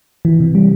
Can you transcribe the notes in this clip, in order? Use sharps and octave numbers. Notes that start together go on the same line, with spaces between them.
E3
C3
G3